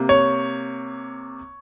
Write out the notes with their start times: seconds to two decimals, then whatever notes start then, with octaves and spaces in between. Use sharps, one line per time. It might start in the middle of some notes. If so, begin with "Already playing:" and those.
Already playing: C3 A#3
0.09 C#5